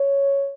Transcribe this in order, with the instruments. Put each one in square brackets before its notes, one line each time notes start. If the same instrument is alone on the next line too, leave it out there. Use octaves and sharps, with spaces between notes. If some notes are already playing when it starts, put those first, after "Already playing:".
Already playing: [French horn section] C#5